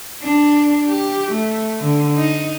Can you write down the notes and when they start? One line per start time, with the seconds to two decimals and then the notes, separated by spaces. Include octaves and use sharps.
0.23 D4
0.89 G4
1.32 A3
1.81 D3
2.17 D#4